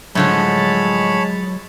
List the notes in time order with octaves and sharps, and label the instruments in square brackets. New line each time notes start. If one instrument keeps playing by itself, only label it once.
[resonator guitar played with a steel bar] A2 D3 F3 [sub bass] F#3 [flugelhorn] G#3 [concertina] C#5 A5 B5